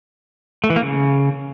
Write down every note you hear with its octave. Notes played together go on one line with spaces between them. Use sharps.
A3
E3
A#3
C#3